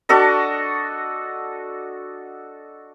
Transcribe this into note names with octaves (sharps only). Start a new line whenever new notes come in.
D4 F#4 A4 D#5